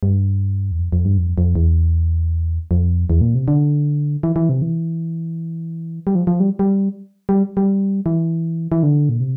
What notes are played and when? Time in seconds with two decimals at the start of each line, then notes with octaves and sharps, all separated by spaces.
0.03 G2
0.71 E2
0.79 F2
0.92 F2
1.05 G2
1.18 F2
1.38 F2
1.55 E2
2.71 F2
3.10 E2
3.21 A#2
3.35 C3
3.48 D3
4.23 E3
4.36 E3
4.49 C3
4.62 E3
6.07 G3
6.15 F3
6.27 F3
6.40 G3
6.59 G3
7.29 G3
7.57 G3
8.06 E3
8.72 E3
8.83 D3
9.09 A#2
9.20 C3